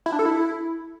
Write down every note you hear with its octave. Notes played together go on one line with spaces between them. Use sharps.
E4
D4
A4
E4